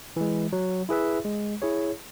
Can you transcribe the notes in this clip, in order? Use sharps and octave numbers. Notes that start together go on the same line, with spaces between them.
E3 G#3
F#3
E4 G#4 B4 E5
G#3
E4 G#4 C#5